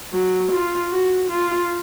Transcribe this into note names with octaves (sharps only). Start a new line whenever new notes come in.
F#3
F4
F#4
F4